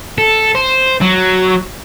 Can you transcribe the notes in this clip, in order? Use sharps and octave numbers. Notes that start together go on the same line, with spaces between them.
A4
C5
F#3